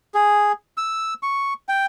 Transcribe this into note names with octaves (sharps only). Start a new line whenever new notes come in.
G#4
E6
C#6
G5